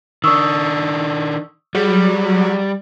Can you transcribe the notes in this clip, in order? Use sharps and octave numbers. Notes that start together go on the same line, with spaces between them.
D#3 D4 C#6 D#6 E6
F#3 G3 G#4